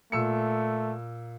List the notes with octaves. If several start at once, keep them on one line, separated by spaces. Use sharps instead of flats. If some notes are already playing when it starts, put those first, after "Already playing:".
A#2 A3 E6 C#7